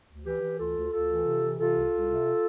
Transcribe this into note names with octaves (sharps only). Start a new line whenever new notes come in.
D2
E3 G4 B4
E3
D2 F4 A4
D2
D2 F4 A4
E3
C3
E3
C3 F4 A4
C2
C2
C3